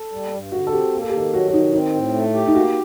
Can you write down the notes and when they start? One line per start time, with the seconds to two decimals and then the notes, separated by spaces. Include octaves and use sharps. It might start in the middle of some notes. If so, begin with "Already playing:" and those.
Already playing: A4
0.12 G3
0.33 G2
0.52 D3 F#4
0.67 A4
0.72 C4 G4
0.93 A#3
1.02 A4
1.09 G4
1.14 D#3 A4
1.33 F#3 F#4
1.48 F#4
1.53 D#3 D#4
1.73 C4 D#4
1.94 A2
2.14 A3
2.34 G4
2.47 D#4
2.54 A#3 F#4